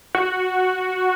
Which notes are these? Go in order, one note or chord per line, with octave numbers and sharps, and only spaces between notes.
F#4